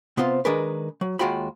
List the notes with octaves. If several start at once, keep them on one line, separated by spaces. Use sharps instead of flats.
C3 B3 C4 F4 C6
D#3 G#3 D4 G#4 A#4 B4
F#3
D#2 G#3 F4 F#4 G5 B5